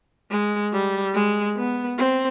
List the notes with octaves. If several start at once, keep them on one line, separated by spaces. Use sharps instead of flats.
G#3
G3
G#3
B3
C4